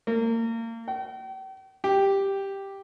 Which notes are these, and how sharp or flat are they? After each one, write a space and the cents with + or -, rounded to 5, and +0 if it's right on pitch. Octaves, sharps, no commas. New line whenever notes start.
A#3 -30
G5 -40
G4 +0